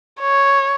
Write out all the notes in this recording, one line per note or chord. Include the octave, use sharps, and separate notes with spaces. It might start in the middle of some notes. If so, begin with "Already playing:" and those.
C#5